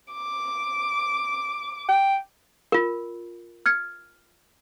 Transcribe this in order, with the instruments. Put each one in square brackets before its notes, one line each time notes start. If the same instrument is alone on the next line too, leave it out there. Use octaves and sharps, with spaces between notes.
[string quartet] D6
[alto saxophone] G5
[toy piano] F4 A#4
[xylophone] F6 G#6 C#7